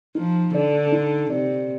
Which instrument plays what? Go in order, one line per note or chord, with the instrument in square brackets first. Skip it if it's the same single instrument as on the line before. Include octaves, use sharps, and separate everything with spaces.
[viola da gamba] F3 [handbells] D#4
[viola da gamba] D3 [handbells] D5
[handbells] D#4
[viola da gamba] C3 [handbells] D5